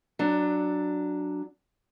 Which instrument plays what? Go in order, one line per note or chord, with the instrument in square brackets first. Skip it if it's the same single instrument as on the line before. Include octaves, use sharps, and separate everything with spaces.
[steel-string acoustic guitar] F#3 D4